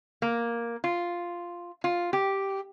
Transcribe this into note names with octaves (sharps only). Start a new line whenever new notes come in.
A#3
F4
F4
G4